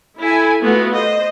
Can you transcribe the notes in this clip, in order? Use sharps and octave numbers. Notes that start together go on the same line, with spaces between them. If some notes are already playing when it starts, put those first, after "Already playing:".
E4 A4 G#5
A3 B3 F4 F#4
C5 D#5